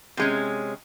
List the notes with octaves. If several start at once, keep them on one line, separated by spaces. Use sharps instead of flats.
C3 G#3 C#4